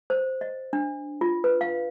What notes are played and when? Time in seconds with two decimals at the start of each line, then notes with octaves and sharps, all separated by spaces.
0.10 C5
0.41 D#5
0.73 D4
1.21 F4
1.44 B4
1.61 F5